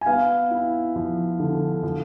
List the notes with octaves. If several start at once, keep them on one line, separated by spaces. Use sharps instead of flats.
G#5
B3 F5
E4
F3
D3
F3